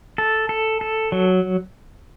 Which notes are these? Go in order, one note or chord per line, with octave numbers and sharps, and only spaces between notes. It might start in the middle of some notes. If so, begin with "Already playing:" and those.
A4
A4
A4
F#3